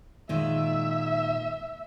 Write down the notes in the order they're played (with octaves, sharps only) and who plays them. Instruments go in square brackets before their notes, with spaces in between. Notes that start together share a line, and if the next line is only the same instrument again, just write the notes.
[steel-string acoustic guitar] A#2 D#3 G#3 [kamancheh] E5